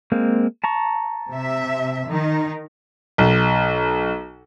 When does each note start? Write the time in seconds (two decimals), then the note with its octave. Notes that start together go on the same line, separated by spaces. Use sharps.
0.12 G#3 A#3 C4
0.64 A5 A#5 C#6
1.31 C3 E5
2.08 D#3 D#4
3.18 B1